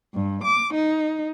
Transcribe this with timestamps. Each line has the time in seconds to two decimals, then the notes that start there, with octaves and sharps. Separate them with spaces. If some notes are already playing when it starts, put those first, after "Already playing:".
0.14 G2
0.44 D6
0.73 D#4